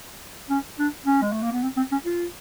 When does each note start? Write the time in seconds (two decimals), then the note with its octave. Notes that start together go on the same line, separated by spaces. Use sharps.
0.49 C#4
0.79 D4
1.06 C#4
1.22 G#3
1.32 A3
1.42 A#3
1.52 B3
1.63 C4
1.77 C4
1.92 C#4
2.06 F4